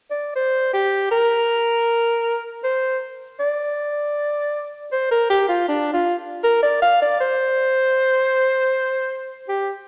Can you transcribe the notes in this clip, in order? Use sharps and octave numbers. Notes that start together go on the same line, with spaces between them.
D5
C5
G4
A#4
C5
D5
C5
A#4
G4
F4
D4
F4
A#4
D5
F5
D5
C5
G4